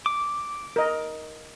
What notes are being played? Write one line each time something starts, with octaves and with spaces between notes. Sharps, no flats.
D6
A#4 D#5